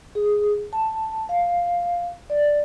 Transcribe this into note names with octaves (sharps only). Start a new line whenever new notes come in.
G#4
A5
F5
D5